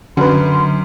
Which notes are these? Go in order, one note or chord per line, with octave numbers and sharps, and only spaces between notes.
F#2 D3 C#4 F#4 B4 C6